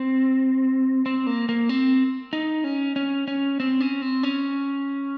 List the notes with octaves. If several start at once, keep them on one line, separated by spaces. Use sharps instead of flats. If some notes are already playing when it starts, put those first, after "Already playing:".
Already playing: C4
C4
A#3
A#3
C4
D#4
C#4
C#4
C#4
C4
C#4
C4
C#4